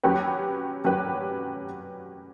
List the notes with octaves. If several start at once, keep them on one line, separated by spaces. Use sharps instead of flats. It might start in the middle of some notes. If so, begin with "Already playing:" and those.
F#3 C#4 G4 B4
F#3 C#4 G4 B4